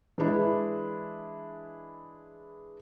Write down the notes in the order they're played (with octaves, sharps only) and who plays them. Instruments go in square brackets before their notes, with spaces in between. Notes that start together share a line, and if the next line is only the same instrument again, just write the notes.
[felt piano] E3 G#3 D4 E4